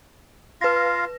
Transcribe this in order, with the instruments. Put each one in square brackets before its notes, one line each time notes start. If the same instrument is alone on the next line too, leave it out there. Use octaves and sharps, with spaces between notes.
[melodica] F4 F5 [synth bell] B4 A#6